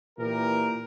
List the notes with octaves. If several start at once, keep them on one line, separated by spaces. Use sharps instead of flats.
A#2 E3 G4 A#4